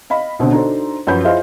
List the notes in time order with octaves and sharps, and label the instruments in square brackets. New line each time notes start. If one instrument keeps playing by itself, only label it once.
[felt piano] D#5 F5 B5
B1 B2 D3 C4
D4 D#4 F#4 A4 C5
F#2 F3 F#4 B4 B5 G6
E4 F4 G#4 C5 D#5 F5